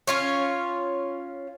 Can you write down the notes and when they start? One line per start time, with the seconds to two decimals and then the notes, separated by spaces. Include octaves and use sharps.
0.07 C#4 F4 C#5